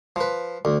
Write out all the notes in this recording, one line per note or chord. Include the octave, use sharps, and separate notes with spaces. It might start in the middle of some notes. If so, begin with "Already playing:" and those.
F3 B4
D2